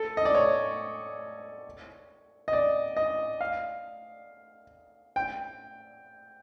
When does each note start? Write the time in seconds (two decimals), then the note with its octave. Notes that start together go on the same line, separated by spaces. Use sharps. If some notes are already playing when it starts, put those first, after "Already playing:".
Already playing: A4
0.17 D#5
0.25 D5
0.35 C#5
2.48 D#5
2.53 D5
2.97 D#5
3.41 F5
5.16 G5